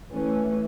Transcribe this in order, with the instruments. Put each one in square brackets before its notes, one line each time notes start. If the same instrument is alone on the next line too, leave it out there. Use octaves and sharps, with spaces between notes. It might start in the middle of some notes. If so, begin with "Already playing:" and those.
[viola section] E3 A3 C#4